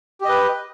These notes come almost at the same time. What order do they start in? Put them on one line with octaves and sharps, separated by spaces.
G4 D#5 B4